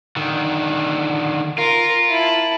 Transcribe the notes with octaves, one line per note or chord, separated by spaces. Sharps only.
D3 D#3
F4 A#4
E4 A5